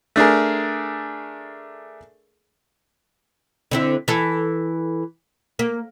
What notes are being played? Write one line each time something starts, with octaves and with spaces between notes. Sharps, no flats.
A3 D4 G#4 A#4
D3 C4 E4
E3 A4
A#3